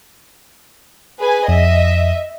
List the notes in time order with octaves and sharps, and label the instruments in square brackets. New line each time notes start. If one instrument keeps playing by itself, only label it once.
[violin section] G#4 B4 G#5
[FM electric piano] F2 [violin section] D#5 E5